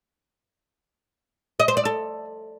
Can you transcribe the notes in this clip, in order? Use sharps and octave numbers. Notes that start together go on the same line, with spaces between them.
D#5
C5
D5
A4